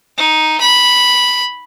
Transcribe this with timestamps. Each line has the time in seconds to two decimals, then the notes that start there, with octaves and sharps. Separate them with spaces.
0.17 D#4
0.61 B5